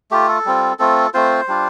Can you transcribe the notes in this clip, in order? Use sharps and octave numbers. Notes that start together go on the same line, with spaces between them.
A3 F4 G4
A4
G3 C4 F4
A3 C4 F4 A4
A3 C4 F4 C5
G3 D4 F4